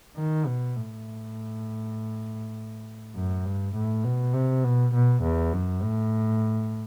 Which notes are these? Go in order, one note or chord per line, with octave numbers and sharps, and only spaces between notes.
D#3
B2
A2
F#2
G2
A2
B2
C3
B2
B2
E2
F#2
A2